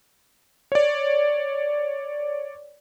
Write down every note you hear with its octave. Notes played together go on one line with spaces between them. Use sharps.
C#5 D5